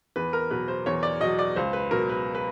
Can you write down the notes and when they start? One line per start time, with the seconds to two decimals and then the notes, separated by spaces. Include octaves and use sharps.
0.16 E2 B4
0.33 A#4
0.50 B2 F#3 B4
0.68 C5
0.86 E2 C#5
1.03 D5
1.20 B2 F#3 D#5
1.39 D5
1.56 C#2 C5
1.73 B4
1.91 B2 F#3 A#4
2.09 B4
2.35 B4